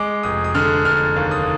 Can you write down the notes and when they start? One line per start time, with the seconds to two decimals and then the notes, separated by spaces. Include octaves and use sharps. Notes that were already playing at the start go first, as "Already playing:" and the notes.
Already playing: G#3 D6
0.23 F1 D#6
0.44 D#6
0.55 D3 F6
0.85 F1 F6
1.16 D#2
1.31 D#6